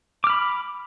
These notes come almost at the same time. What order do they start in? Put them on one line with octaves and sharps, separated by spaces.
D6 F6 B5